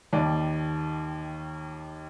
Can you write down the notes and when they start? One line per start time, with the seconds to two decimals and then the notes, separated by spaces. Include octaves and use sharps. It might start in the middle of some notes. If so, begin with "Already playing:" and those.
0.13 D#2 D#3 D5